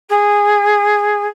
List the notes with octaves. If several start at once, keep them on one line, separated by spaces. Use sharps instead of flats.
G#4